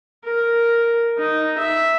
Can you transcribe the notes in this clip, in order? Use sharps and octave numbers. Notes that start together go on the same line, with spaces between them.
A#4
D#4
E5